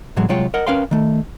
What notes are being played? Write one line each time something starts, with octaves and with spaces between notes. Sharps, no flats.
A2 E3 F#3 G#3
C2 F#3 G#3 F4 C#5 G5
A#4 D#5 F#5
C#4 A#4 B4 F5 G5 C6
D#3 A3